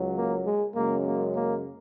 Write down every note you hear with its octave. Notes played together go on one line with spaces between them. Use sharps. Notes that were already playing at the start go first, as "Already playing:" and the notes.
Already playing: C#2 F#3
A#3
G#3
F#2 C#3 G#3 A#3
A#3
A#3